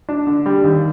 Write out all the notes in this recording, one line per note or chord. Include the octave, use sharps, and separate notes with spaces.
D4
D3
G3
D#2